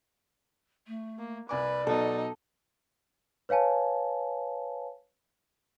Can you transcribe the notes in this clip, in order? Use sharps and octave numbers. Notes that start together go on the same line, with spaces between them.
A3
A#3
C2 B4 D5 G#5 D6
B2 F#3 D#4 A4
B4 C#5 F5 G#5 A5